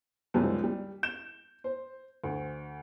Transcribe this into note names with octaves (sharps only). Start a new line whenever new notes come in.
C#2 F#2 C3 D#3 G3 G#3
G3
G6 E7
C5
D2